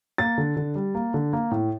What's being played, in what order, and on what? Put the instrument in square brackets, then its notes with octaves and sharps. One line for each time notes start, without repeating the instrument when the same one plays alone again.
[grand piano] A#3 A6
D3
D3
G3
A#3
D3
A#3
A2